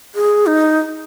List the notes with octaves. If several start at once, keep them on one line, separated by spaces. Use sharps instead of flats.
G#4
D#4